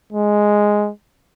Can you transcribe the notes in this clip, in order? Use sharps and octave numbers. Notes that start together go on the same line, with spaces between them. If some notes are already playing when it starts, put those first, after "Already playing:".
G#3